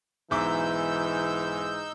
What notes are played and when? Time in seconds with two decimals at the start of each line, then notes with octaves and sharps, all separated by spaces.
0.31 B1 G#2 E3 D#4 E5 D6 E6 G6